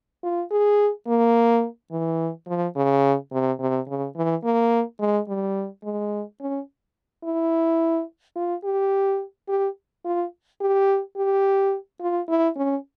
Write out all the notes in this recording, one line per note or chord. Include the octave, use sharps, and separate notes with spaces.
F4
G#4
A#3
E3
F3
C#3
C3
C3
C#3
E3
A#3
G#3
G3
G#3
C#4
E4
F4
G4
G4
F4
G4
G4
F4
E4
C#4